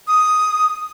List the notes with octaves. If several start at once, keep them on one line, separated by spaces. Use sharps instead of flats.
D#6